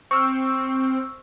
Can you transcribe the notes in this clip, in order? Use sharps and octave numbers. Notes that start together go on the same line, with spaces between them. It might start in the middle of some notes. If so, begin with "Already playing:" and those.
C4 C#6 E6 F6